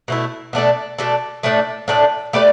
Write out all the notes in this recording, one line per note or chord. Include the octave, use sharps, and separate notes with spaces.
B2 A3 E4
B2 A3 D4 A4
B2 A3 D4 A4
A2 A3 D4 A4
A2 A3 D4 A4
A3 G4 B4 D5